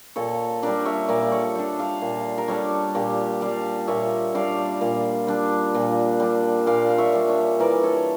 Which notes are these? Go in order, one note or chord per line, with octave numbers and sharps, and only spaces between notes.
A#2 A4 C#5
G3 D4 A#4 D5
C#5 E5
A#2 A#4 D5
D5
A4 C#5
G3 D4
D5 F5
A#2
A#4
G3 D4 A4 C#5
A#2 G4 A#4
G3 D4 D5 F5
A#2 C#5 E5
G3 D4 D5 F5
A#2
G3 D4
A#2
G3 D4
A#2 D5 F5
F5
C#5 E5
G3 D4
C#5 E5
E3 A#4 D5
A4 C#5